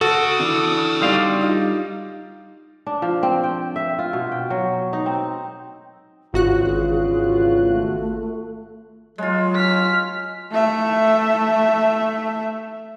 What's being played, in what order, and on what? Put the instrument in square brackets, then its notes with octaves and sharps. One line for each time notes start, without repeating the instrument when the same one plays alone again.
[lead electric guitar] C#3 [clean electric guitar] F#4 [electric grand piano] A4
[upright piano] E3 D4
[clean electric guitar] G3 F5 [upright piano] D4 D#4 C6
[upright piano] D#4 F4
[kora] D4
F3
C4
G5
E5
F4
B2
G5
F#3
D#4
C4
[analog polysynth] G#1 F#4 F#6 [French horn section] E2 C#3 F4 [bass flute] G#4
[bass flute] A3
[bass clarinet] F#3 [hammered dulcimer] G#3 F4
[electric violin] F6 B6
[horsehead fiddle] A3 E5